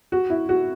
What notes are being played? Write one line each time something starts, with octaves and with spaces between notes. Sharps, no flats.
F#4
E4
F#4